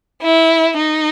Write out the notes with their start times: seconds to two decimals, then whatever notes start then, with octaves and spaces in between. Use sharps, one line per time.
0.23 E4
0.77 D#4